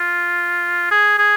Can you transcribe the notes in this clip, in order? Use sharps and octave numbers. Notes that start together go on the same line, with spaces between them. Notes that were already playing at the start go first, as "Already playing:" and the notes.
Already playing: F4
G#4
G#4